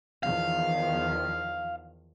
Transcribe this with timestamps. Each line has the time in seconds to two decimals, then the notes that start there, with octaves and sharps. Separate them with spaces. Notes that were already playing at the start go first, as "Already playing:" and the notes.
0.23 E2 D#3 F3 F5